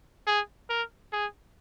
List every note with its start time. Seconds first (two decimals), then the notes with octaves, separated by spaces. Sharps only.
0.27 G#4
0.70 A#4
1.13 G#4